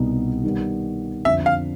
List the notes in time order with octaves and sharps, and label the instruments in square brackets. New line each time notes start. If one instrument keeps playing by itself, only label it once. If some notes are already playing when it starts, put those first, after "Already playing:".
Already playing: [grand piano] C2 B2 G3 B3 D#4
D#3 G3 B3
[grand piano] F2 D3 F3 [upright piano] E5
[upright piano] F5